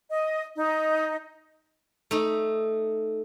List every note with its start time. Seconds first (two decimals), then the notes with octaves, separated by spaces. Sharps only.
0.10 D#5
0.56 D#4
2.11 A3 D#4